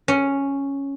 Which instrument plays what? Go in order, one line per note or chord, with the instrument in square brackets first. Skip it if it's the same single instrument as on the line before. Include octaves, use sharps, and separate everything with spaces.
[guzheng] C#4